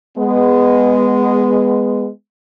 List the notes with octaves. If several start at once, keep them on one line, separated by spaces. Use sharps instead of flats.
G#3 B3